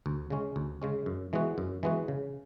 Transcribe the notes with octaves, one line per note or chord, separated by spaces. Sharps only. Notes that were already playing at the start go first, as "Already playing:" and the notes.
D2
C#3 G#3 C#4
D2
C#3 G#3 C#4
F#2
E3 G#3 B3 F#4
F#2
E3 G#3 B3 F#4
C#3